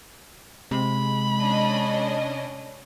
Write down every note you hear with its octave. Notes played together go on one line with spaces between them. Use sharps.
C3 G#3 B5
C#4 D4 D#5